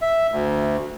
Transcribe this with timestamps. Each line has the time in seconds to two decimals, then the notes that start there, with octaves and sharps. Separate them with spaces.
0.02 E5
0.32 D2